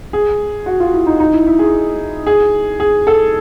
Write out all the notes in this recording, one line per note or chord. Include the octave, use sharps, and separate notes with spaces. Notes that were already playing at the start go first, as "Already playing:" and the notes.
G#4
F#4
F4
E4
D#4
D#4
E4
E4
G#4
G#4
G#4
A4